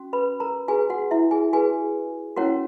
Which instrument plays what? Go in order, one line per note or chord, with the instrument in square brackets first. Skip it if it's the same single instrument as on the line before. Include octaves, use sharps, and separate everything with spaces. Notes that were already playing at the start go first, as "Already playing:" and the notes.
Already playing: [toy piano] C#4 F#4
B4 B5
A#4 A#5
F#4 G#4 B4 G#5
F#4 F#5
E4 E5
G#4 G#5
F#4 G#4 B4 G#5
C#4 E4 F#4 A#4 C#5 F#5